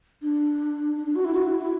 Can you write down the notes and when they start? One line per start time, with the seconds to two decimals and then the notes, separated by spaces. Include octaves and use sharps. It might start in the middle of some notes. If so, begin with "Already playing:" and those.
0.22 D4
0.96 D4
1.07 D4
1.15 F#4
1.25 E4
1.34 F#4
1.47 E4
1.59 E4